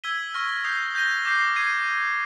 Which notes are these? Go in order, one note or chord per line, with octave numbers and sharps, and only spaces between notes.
E6 G#6 B6 D#7 G7
C#6 F6 A#6
D#6 G6 C7 F7
G6 A#6 D#7 G7
D6 G6 C7
G#6 C7 D#7